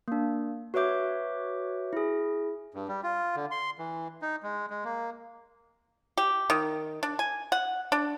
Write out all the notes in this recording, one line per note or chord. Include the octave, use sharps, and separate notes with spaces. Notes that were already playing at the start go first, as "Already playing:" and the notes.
A#3 D4
F#4 B4 C#5 E5 D6 G6
E4 G#4
G2
G3
F4
D3
C6
E3
D#4
G#3
G#3
A#3
G4
D#3
D4
G#5
F#5
D4